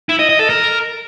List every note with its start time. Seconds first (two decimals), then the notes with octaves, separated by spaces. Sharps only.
0.09 E4
0.19 D#5
0.29 D#5
0.39 A4
0.49 A#4